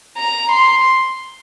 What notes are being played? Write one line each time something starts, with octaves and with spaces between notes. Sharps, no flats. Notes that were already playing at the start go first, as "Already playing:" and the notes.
A#5
C6